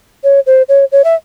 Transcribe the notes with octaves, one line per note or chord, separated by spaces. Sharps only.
C#5
C5
C#5
C#5
E5